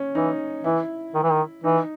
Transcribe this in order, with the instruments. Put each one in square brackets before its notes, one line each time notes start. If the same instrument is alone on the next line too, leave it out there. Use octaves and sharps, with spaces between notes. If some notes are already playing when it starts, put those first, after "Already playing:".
Already playing: [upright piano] C#4
[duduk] E3 [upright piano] D#4
[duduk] E3 [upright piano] E4
[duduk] D#3
E3
D#3
[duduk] E3 [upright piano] D#4